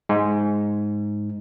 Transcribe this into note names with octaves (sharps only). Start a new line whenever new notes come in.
G#2